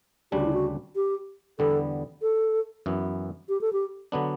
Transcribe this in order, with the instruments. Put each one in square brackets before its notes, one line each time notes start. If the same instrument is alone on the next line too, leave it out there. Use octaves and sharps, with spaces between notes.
[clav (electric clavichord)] D2 C#3 G3 D4 [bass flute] G4
[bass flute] F#4
E4
F#4
G4
[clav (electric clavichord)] E2 D3 G3 B3 [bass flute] A4
[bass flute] A4
[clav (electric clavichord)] F#2 E3 B3
[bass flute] G4
A4
G4
[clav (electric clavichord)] D3 F#3 B3 D4